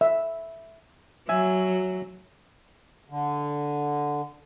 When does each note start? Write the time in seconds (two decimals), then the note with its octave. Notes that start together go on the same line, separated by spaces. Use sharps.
0.01 E5
1.29 F#3 E5 G#5
3.10 D3